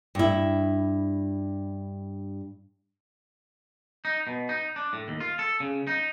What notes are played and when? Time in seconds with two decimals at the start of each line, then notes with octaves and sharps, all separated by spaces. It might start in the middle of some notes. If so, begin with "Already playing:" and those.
0.15 G2 E4
4.05 D#4
4.27 B2
4.49 D#4
4.76 D4
4.93 A2
5.08 D#2
5.20 F4
5.39 A4
5.60 C#3
5.87 D#4